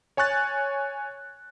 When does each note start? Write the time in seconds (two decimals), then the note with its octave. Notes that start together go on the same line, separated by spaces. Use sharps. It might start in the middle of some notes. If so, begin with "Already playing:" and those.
0.17 C#5 G#5 C#6 F#6 A6